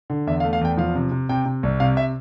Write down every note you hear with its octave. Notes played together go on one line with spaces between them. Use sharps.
D3
E2 E5
F5
A3
F5
E2 G5
F3 F5
C3
C3
C3 G5
C3
C2
C3 F5
E5